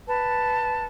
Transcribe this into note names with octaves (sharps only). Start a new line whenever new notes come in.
B4 A5